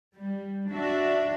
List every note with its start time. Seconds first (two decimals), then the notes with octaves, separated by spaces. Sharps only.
0.15 G3
0.70 D4 F#4 E5